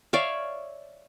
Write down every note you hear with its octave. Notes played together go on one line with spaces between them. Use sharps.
C#5 D5 E5 F5